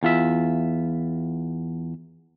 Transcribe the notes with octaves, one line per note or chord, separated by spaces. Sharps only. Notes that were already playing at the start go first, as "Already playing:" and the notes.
E2 F4 E5